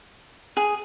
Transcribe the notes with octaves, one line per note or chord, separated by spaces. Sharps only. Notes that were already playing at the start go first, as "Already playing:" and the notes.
G#4